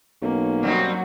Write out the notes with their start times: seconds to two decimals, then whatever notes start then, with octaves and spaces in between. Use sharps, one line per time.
0.22 B1 A#3 C#4
0.63 F#3 G3 C4 D#4 F#4